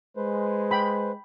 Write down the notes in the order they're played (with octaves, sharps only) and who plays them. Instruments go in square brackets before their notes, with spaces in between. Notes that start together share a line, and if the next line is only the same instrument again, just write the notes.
[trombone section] G#3 [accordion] B4 C5
[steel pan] G5 B5